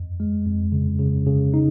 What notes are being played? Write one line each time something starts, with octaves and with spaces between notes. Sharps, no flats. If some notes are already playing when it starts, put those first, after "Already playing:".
Already playing: F2
G#3
F2
C#3
C#3
C#3
D#4